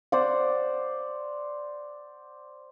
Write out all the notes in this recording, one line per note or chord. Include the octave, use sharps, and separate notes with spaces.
C5 D5 F#5